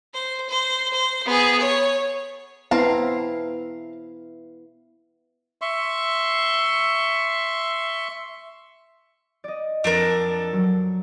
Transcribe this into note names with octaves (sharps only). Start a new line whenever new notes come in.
C5
C5
C5
B3 G#4
C#5
B3 C4 E4 F5 A5 A#5
E5 C6 C#6
D5 D#5
F2 D4 A4 A#4
F#3